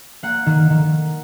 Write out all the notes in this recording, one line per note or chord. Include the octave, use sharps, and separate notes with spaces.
A#3 F#5
D#3
D#3